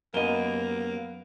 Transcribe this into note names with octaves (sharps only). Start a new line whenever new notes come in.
F#2 A#3 B3 A#4 D#5 G7